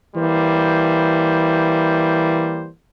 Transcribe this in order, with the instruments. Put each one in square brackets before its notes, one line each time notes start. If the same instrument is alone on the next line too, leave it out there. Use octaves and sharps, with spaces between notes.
[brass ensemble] E3 G3 A#3 C5